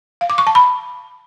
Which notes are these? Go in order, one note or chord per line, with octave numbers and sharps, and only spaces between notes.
F5
D6
C#6
A5
B5